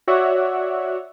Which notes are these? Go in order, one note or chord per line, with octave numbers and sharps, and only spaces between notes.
F#4 C#5 D5 E5 F#5